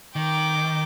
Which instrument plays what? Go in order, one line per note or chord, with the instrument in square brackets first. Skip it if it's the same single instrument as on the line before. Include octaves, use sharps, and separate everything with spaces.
[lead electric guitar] D#3 [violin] G5 D6